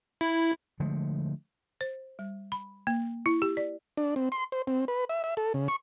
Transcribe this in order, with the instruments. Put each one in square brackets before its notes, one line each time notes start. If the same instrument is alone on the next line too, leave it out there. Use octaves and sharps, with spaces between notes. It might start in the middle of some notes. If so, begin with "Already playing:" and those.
[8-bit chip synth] E4
[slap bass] D3 F3 G#3 A3
[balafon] C5
G3
B5
A#3
E4
G4
D5
[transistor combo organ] D4
C4
C6
C5
C4
B4
E5
E5
A4
C#3
C#6